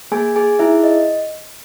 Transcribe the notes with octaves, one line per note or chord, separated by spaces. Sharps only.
A#3 G#4 G#5
G#4 G#5
D#4 E4 G#4 E5
D#5